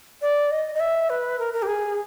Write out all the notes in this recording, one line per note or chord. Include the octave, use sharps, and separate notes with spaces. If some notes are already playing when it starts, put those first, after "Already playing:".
D5
D#5
D#5
E5
B4
A#4
A#4
G4
G#4